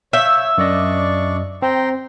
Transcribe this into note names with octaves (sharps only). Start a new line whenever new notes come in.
C#5 E5 F5 G6
F#2 D4 D5 D#5 C#6
C4 G5 A#5 C6